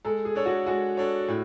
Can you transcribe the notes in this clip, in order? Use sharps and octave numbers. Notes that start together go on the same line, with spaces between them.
G#3 A4
G#4
D4 A4 C#5
F#4
G#3 F#4
D4 A4 C#5
A2